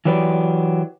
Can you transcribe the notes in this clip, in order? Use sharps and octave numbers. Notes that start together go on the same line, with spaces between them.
E3 F#3 G4 B4 D5